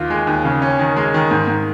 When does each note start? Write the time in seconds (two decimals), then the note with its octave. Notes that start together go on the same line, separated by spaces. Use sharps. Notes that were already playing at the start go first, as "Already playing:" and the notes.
Already playing: D#2 F4
0.10 G#3
0.27 D#2
0.45 C#3
0.62 C#4
0.79 D#3
0.96 G#3
1.14 D#3
1.31 G#2
1.48 G#2